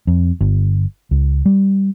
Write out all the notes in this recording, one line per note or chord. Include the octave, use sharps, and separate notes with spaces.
F2
G1
C#2
G3